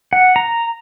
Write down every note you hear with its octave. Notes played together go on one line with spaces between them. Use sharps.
F#5
A#5